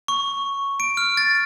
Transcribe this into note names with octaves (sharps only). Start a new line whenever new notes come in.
C#6
D7
F6
A6